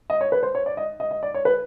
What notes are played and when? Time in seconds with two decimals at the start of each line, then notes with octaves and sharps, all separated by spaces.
0.10 D#5
0.21 C#5
0.32 B4
0.43 C5
0.55 C#5
0.66 D5
0.77 D#5
1.00 D#5
1.11 D#5
1.23 D5
1.34 C#5
1.45 B4